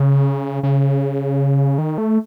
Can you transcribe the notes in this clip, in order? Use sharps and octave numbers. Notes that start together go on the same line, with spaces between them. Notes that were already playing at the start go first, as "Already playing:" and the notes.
Already playing: C#3
C#3
D#3
A3